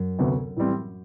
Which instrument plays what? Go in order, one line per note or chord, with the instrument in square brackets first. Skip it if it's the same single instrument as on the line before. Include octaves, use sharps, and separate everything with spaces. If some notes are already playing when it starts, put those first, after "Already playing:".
Already playing: [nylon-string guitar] F#2
[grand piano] D2 C3 F#3 B3
A2 E3 G3 C4